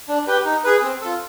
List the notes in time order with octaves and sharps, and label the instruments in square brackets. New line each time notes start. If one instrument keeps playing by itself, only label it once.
[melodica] D4
G4 B4
D#4
G#4 B4
C4
F4 A4